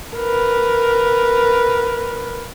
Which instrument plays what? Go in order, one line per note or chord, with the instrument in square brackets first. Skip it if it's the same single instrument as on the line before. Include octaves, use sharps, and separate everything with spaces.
[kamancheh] A#4 B4